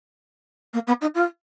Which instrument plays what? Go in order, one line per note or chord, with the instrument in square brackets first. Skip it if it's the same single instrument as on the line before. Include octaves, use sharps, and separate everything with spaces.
[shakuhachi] A#3
B3
D#4
F4